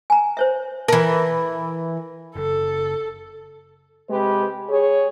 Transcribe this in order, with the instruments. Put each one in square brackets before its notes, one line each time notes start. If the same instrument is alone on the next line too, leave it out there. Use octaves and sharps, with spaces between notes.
[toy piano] G#5 A#5
C5 C#5 E5
[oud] E3 A#4 [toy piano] A5
[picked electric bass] F#1 [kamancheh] A4
[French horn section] C3 G#3 G4 B4
G#4 C#5